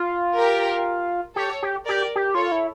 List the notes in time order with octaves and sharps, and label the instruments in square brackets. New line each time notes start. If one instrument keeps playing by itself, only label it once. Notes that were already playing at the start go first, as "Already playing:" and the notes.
Already playing: [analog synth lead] F4
[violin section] G4 A#4
[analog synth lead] G4 [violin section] A4 C#5
[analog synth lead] G4
[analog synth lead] G4 [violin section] A#4 D5
[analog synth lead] G4
[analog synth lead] F4 [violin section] A4 C#5
[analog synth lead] E4